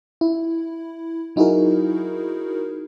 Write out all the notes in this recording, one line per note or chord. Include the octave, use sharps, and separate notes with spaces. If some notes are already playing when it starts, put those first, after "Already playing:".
E4
F#3 D#4 E4 F#4 G#4 A#4